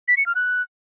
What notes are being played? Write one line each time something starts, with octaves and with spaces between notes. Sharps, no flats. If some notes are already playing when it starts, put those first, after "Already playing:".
B6
C#7
F6
F#6